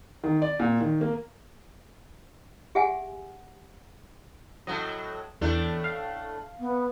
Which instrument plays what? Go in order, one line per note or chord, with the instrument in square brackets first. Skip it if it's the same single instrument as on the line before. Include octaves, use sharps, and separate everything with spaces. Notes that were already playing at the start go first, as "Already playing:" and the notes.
[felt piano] D#3
D5
A#2
D#3
A#3
[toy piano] G4 G#4 E5 F#5 G#5
[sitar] A2 F#3 [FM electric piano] D#5
[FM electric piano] E2 [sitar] A2 A3 D4
[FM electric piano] F5
[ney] B3